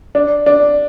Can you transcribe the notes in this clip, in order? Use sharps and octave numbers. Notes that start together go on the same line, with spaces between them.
D4
D4